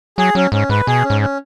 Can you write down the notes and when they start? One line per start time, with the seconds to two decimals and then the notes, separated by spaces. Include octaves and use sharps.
0.18 F#3 G#4
0.35 F#3 C#4
0.52 G#2 C#4
0.69 G#2 B4
0.87 B2 G#4
1.04 C#4
1.10 G#2
1.21 C#4